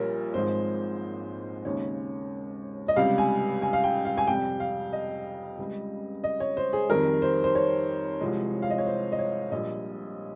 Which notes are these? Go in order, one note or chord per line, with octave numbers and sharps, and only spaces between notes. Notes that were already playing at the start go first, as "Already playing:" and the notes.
Already playing: A#1 A#2 G3 A#4 C#5
G#1 G#2 F3 G#3 C5
D#2 C#3 G#3 C#5
D#5
C#2 C3 G3 F5
G#5
G#5
F5
G5
F5
G#5
F2 C3 G3 G5
F5
D#5
C#2 C#3 G3
D#5
C#5
C5
G#4
F2 D#3 G3 A#4
C5
C5
C#5
C2 C3 F3 G#3
F5
D#5
C#5
C5
D#5
C#5
A#1 A#2 G3 D#5